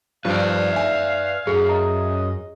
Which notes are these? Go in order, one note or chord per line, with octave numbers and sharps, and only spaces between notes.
G2 F3 B4 D5 F5
E5 G#5
F#2 G#4
D#5 A#5